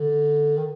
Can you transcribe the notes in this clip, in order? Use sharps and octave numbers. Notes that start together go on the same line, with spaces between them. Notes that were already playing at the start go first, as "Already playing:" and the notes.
Already playing: D3
D#3